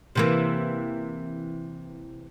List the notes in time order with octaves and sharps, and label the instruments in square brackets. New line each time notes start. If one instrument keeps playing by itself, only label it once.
[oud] C3 E3 A#3